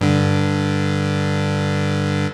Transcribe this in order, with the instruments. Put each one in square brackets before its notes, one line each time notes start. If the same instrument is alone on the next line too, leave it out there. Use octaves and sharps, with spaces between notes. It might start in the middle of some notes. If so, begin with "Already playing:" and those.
[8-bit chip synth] G2 D3